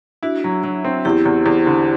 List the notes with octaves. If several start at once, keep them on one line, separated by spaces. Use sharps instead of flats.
D4 E4 F#4
F#3
F#3
C4
E2 E4 G4
E2
E2
D3